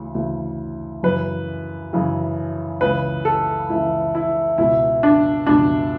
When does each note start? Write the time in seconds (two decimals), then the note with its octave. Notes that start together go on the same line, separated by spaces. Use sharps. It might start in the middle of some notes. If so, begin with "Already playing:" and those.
Already playing: D2 C#3 E3
0.14 D2 C#3 E3
1.03 F#2 C#3 E3 B4
1.93 F#2 C#3 E3
2.81 C#2 C#3 E3 B4
3.25 A4
3.69 C#2 C#3 E3 E4
4.15 E4
4.58 C#2 B2 E4
5.03 D4
5.47 C#2 B2 D4